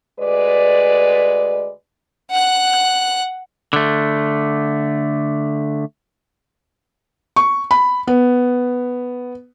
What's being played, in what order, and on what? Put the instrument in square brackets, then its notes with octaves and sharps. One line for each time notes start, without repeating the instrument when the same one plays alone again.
[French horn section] D2 G#3 B4 D5
[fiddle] F#5 F#6
[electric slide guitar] D3 A3
[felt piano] C#6
B5
B3